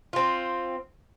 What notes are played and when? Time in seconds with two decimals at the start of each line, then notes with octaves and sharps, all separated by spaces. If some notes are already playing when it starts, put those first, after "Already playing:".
0.13 C4 F4